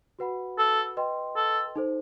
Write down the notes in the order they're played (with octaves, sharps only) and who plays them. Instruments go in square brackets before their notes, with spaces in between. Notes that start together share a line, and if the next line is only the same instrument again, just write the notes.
[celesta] F#4 B4 F#5 B5
[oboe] A4
[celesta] B4 D#5 G5 C6
[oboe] A4
[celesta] D#4 A4 C5